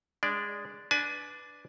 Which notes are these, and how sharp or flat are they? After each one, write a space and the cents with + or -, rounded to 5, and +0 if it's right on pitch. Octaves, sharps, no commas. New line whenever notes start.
G#3 -15 D4 -5 D5 +0
D4 +0 B4 +0 G#5 +30